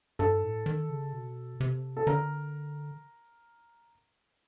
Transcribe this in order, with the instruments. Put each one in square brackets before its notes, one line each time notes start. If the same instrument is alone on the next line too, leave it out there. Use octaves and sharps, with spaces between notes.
[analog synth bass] G2 [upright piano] A4
[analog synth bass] A2
D#3
C#3
B2
C3
[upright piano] A4
[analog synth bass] D3 [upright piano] A#4